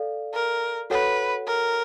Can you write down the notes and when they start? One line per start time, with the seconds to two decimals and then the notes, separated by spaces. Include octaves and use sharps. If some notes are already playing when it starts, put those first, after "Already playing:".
Already playing: A4 D5 F5
0.34 A#4
0.90 F#4 A4 B4 C#5 F#5
1.47 A#4